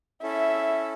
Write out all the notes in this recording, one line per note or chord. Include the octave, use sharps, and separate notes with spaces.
C#4 E4 A4 E5